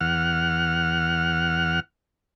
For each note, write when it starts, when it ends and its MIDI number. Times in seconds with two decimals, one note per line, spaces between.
0.01 1.80 40
0.01 1.80 78
0.01 1.80 89